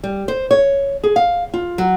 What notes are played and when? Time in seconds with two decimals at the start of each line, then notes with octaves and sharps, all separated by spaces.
0.03 G3
0.28 C5
0.51 C#5
1.04 G#4
1.16 F5
1.54 F4
1.78 F#3